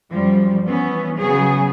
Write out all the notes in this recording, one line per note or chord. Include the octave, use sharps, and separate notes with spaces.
F#2 F3 G3
E3 B3 C#4
C#3 F#3 B3 G#4